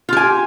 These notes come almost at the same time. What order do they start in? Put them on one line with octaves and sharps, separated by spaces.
F4 G4 G#5